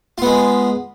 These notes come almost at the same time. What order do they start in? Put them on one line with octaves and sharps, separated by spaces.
F4 B3 G#3